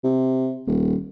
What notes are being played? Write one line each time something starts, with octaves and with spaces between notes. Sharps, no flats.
C3
D#1